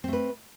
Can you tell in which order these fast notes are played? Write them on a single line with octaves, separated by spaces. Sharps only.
C4 A3 B4